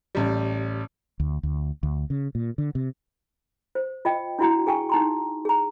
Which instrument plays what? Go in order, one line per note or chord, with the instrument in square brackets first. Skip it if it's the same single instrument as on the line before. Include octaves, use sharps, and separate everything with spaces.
[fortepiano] A1 G3
[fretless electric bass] D2
D2
D2
C#3
A#2
D3
C3
[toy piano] C5
F4 D#5 G5
D4 E4 F#4 F#5 A#5
G#4 G5 G#5 C#6
D#4 A#5 C6
G#4 A#5